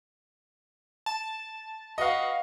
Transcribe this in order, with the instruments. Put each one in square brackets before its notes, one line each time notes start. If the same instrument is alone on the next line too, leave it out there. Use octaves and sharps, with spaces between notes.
[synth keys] A5
[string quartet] F#4 B4 [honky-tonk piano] D#5 F5